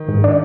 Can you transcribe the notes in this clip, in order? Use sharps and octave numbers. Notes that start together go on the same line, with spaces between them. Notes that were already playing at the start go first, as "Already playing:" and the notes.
Already playing: D#3
G#2
D4